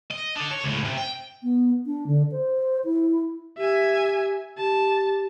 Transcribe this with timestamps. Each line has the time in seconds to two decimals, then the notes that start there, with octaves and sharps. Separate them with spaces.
0.11 D#5
0.36 D4 A4
0.51 C#5
0.64 C#2 A2
0.84 C3
0.97 G5
1.43 B3
1.86 D4
2.07 D3
2.32 C5
2.85 E4
3.58 G4 E5 G#5
4.58 G4 A5